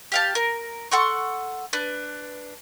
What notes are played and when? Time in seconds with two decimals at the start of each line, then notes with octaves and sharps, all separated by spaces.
0.12 G4 F5 A5
0.35 A#4
0.91 A4 F#5 C6 C#6
1.73 D4 B4